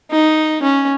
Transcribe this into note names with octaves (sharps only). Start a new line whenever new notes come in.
D#4
C#4